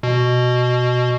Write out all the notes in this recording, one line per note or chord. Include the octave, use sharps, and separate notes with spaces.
B2